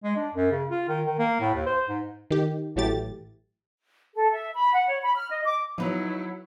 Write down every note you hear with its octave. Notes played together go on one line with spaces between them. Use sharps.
G#3
D4
F#2
C#3
F4
D#3
D#3
A#3
A2
D#2
C5
G#2
D#3 G4
A1 E3 F#3 A3 G4 A6
A4
E5
B5
F#5
C#5
B5
F6
D#5
D6
F3 F#3 B3 D#4 E4 B4 C#5